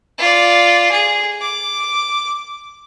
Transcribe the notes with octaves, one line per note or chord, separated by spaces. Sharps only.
F4 D5
G#4
D6